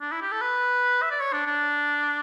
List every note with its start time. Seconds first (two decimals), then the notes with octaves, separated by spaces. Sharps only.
0.01 D4
0.12 E4
0.22 G4
0.32 A4
0.42 B4
1.02 E5
1.11 D5
1.21 C#5
1.33 D4
1.46 D4